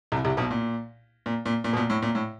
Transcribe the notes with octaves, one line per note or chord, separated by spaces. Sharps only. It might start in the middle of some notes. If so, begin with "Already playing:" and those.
C2 C3
C2 C3
B1 B2
A#2
A#2
A#2
A#2
B2
A#2
A2
A#2
A2